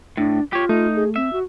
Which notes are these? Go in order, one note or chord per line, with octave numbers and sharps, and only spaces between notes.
A2 D4
F4 G4 C#5
A3 D#4
G#4
C4 E5
F#4